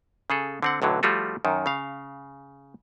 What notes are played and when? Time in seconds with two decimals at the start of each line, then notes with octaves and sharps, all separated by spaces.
0.30 C#3 G#4 A4
0.63 D3 C4 F#5
0.82 B1 A2 D3 F#3
1.03 F3 G3 A3 F4 F#4
1.45 F#2 D#3
1.66 C#3 F5